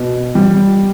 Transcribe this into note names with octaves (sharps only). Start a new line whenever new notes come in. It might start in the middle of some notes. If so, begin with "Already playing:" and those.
Already playing: B2
G3